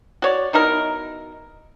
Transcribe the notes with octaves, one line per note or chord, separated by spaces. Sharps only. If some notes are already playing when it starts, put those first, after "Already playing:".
F#4 C#5 D5
B2 D#4 E4 A#4